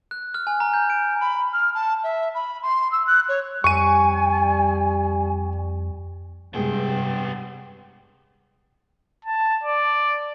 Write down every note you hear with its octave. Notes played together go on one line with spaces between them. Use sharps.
F#6
F6
G#5
A#5
G6
D7
B5
F6
A5
E5
B5
C6
E6
F#6
C#5
F2 G3 G#5 C#6 D#7
G2 C3 G#3 B3 G#4 G5
A5
D5